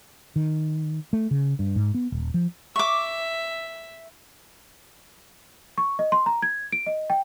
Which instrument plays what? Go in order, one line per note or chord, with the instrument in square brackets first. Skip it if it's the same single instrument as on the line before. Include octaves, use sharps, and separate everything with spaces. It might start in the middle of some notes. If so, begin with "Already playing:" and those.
[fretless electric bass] D#3
A3
C#3
G2
G#2
B3
D#1
F3
[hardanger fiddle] E5 [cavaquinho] C#6 D6
[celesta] C#6
D#5
C6
A#5
G#6
D7
D#5
G5